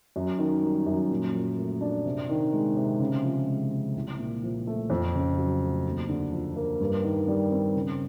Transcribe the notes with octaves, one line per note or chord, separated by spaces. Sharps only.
F#2
D#3
G3
F#2
A#2
F3
A3
D4
C3
D#3
G#3
C3
C#3
F3
G#3
C4
C2
A#2
F3
A3
F2
C#3
F#3
A3
D#2
D3
F3
A#3
G2
D#3
G3
C4
C#3